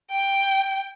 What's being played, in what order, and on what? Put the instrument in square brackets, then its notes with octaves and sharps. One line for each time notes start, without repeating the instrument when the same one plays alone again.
[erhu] G5